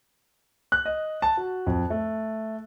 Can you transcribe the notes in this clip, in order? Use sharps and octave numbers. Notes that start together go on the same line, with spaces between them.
F#6
D#5
A5
F#4
F2
A3